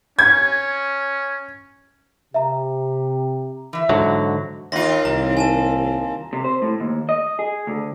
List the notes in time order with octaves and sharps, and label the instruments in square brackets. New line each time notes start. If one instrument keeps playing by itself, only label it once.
[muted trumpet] C#4 [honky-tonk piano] G#6
[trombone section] C3 G4 [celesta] E5 A#5
[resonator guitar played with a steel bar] E3 E5
[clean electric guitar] G#2 D3 F#3
[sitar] D#2 F4 [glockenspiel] C6 A#6
[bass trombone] C2 [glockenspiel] A#5
[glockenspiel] G#5 A5 E7
[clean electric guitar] C3
C5
A2
D#2
D#5
G#4
D2